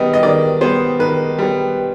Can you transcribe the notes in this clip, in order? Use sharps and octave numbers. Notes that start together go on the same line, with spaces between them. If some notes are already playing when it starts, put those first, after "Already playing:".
Already playing: D#3 G3 B3 D#5
D#5
D#3 D5
G3 B3 C5
D#3 B4
G3 B3